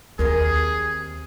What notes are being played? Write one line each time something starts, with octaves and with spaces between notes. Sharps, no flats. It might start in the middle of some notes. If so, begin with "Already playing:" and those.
D#2 C4 G4 G#4 A#4